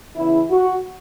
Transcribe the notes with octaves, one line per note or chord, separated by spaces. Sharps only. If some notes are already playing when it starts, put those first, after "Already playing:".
E2 C#3 E3 E4
F#4